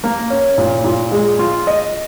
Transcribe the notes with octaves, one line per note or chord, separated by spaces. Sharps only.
A#3
C#4
A#2
A#2
G#3
F4
D#5